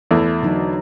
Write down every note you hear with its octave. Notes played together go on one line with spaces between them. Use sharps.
E2 A3 E4
D3 F#3 D#4